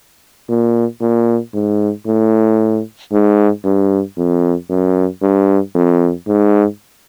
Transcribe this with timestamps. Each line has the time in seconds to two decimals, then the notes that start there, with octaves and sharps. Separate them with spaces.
0.49 A#2
1.01 A#2
1.54 G#2
2.07 A2
3.12 G#2
3.64 G2
4.17 F2
4.69 F#2
5.22 G2
5.74 F2
6.28 G#2